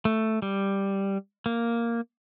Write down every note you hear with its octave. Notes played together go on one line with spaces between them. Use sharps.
A3
G3
A#3